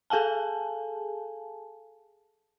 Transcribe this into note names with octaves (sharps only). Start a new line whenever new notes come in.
G#4 A4 F5 G#5 A5